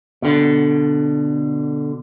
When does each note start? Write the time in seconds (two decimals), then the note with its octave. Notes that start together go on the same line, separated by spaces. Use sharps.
0.22 B2 D3